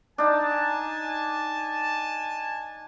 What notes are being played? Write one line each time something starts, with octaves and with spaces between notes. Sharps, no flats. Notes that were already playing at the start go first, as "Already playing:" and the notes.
D4 D#4 G#5 A5